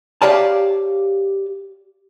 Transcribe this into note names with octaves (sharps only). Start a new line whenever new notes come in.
G4 C#5 D5 F5 A5